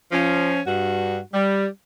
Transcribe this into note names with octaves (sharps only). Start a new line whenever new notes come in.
F3 C#4
G2 F#4
G3